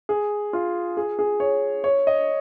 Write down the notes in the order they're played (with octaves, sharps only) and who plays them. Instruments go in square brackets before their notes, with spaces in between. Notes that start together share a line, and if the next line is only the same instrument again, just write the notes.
[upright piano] G#4
F4
G#4
G#4
C#5
C#5
D#5